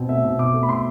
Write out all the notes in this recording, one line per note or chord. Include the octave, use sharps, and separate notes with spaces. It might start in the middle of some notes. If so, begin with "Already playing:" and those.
Already playing: B2 C4
A3 E5
B2
B2 D6
A3
B5
B2 C6